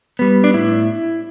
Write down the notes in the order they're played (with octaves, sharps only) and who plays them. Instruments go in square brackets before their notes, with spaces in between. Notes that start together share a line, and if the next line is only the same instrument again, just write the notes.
[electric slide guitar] G3 B3
D4
A2 E4